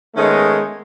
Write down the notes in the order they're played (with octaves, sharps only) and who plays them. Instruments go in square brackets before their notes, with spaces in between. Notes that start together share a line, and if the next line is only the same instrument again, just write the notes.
[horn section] D#3 G#3 A3 B3 C#4 D#4